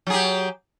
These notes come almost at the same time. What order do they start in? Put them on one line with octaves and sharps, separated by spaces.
F#3 G#4 G4